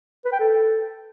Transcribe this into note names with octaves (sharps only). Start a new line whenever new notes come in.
B4
G5
A4